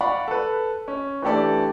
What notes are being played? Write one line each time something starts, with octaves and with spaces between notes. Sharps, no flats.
D5 F5 F#5 B5 C#6
A4 B4
C#4
E3 A3 D4 G4 A4 D5